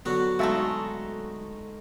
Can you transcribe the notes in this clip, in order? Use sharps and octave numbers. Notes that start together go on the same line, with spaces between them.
D3 F#3 B3 F#4
G#3 A3 D#4 F#4 E5 A5